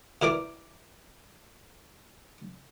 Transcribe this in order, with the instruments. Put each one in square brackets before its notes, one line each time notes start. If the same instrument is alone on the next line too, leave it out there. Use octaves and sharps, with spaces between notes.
[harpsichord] E3 A#4 D5 D6